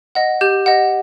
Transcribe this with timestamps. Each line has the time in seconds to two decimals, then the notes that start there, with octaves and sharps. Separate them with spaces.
0.15 D#5 F#5
0.41 G4 G6
0.66 D#5 F#5